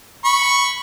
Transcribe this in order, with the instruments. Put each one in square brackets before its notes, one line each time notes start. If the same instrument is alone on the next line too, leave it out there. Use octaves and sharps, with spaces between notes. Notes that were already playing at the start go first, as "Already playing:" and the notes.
[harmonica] B5 C#6